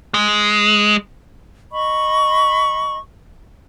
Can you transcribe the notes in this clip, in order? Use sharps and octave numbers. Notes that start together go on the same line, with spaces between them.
G#3
D#5 B5 C#6